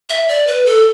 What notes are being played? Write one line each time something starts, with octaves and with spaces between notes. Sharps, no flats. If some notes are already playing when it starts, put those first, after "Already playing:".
E5
D5
B4
A4